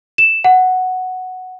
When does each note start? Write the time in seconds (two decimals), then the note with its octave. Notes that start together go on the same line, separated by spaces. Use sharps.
0.18 E7
0.44 F#5